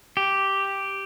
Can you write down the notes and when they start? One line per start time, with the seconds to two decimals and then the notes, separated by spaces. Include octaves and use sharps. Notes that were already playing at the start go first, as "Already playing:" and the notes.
0.17 G4